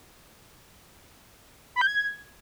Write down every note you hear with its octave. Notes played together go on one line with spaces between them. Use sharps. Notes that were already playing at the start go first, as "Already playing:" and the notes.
B5
G6
G#6